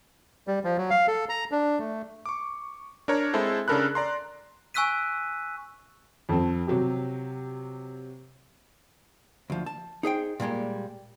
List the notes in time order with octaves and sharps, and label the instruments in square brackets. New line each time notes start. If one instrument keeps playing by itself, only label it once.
[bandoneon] G3
F3
F#3
F5
A4
A#5
D4
A3
[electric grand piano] C#6 D6
D4 A#4 C#5 A#5
G#3 C4 E4 A4 C5
C#3 D4 A4 A#4 B5 F#6
D5 A#5 C6
[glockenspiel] G#5 C#6 E6 F#6 B6 D#7
[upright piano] F2 C4
C3 F#3 G4
[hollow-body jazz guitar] D2 F3
A5
D#4 G#4 C5 G5
A#2 G3 G#3 A#3